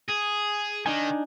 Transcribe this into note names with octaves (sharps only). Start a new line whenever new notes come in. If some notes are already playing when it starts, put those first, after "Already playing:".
G#4
D#3 D4 D#4 G#5